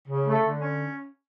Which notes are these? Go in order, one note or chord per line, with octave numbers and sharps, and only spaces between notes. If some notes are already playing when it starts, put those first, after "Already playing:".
C#3
A3
D3
C#4